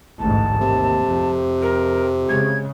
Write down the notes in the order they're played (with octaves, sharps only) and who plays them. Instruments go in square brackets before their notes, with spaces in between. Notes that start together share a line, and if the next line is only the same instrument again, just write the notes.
[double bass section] A1 D2 G#2 [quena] A5
[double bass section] D#2 [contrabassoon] C3
[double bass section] F2
[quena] A#4
[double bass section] C#3 G#3 [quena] G#6